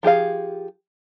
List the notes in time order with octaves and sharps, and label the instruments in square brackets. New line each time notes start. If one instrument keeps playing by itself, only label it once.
[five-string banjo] F3 G4 G#4 F5